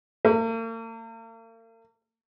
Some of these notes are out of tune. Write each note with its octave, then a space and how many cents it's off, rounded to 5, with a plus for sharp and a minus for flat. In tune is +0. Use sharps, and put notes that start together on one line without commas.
A#3 -45